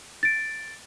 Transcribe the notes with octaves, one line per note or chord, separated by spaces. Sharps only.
A6 D7